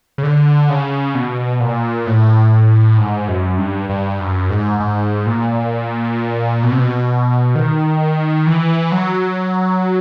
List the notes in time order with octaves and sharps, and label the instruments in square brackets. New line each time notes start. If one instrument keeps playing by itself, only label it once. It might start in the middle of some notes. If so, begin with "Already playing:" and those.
[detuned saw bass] C#3
D3
C#3
B2
A#2
A2
G#2
F#2
G2
G2
F#2
G#2
G#2
A#2
B2
C3
B2
D#3
E3
F#3